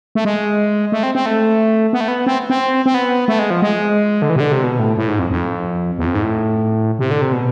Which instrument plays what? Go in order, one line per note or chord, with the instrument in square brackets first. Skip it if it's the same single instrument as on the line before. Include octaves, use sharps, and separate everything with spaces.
[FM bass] A3
G#3
A3
C4
C4
A3
B3
A3
B3
C4
C4
C4
B3
A3
G#3
F3
G#3
D3
E3
C3
D3
C3
B2
A2
A2
G#2
F2
F2
E2
F2
G#2
A2
C3
D3
C3
B2